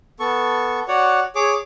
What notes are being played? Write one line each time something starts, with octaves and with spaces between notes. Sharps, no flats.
B3 A4 C#6
F#4 C#5 D5 F#5
G#4 C#5 D6